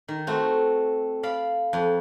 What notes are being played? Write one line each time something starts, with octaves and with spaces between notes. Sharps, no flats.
D#3
A3 C4 F#4
D5 F5 B5
F2